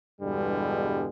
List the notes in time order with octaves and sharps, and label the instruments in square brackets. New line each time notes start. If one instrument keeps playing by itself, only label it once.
[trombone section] E2 G2 B2 D3 G3 G#3